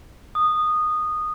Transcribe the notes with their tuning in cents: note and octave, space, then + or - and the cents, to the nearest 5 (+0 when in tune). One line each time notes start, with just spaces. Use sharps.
D#6 -15